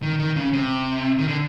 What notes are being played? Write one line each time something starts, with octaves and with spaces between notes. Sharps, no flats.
D#3
D#3
C#3
C3
D#3
D3